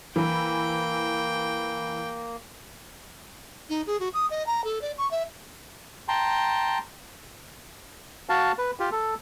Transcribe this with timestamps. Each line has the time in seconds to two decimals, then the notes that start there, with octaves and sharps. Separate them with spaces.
0.16 E3 A#3 G5 B5
3.69 D#4
3.87 G#4
4.00 F#4
4.14 D#6
4.30 D#5
4.46 A#5
4.64 A4
4.82 D5
4.98 C#6
5.11 E5
6.08 G5 A5 A#5 C6
8.29 F#4 F5 A5
8.58 B4
8.80 F4 G4
8.92 A4